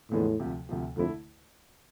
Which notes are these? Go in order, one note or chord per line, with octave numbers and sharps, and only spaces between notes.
E2 A2 D3 F3 G#3 B3
D2 C3 F3
D2 C3 F3
F2 D3 A3 E4